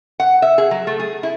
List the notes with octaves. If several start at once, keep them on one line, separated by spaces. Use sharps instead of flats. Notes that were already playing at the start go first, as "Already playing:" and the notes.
F#5
E5
G#4
F#3
A3
G#4
E4